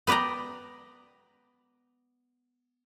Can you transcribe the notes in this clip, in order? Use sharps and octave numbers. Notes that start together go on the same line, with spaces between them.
B3 B4 D5 G5 A#5